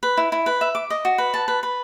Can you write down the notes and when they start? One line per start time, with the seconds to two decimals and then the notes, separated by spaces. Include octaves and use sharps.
0.03 B4
0.17 E4
0.32 E4
0.46 B4
0.61 E5
0.75 D6
0.90 D#5
1.05 F#4
1.18 B4
1.34 A5
1.48 B4
1.63 B4